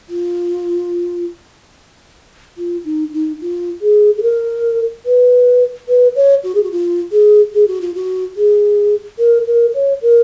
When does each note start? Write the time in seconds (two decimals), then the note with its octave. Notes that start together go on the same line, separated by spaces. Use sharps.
0.09 F4
2.58 F4
2.85 D#4
3.13 D#4
3.41 F4
3.81 G#4
4.17 G#4
4.23 A#4
5.06 B4
5.88 B4
6.16 C#5
6.44 F#4
6.55 G#4
6.63 F#4
6.71 F4
7.12 G#4
7.54 G#4
7.67 F#4
7.81 F4
7.95 F#4
8.36 G#4
9.19 A#4
9.47 A#4
9.74 C#5
10.02 A#4